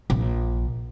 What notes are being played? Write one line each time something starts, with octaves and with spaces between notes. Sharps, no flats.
A#1